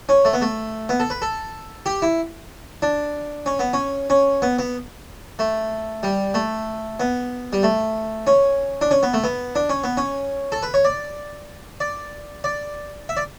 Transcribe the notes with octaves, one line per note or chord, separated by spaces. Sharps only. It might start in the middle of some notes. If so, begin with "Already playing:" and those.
C#4
A3
B3
A3
B3
A4
B4
A4
G4
E4
D4
C#4
B3
C#4
C#4
B3
B3
A3
G3
A3
B3
G3
A3
C#4
D4
C#4
B3
A3
B3
D4
C#4
B3
C#4
A4
B4
C#5
D5
D5
D5
E5
D5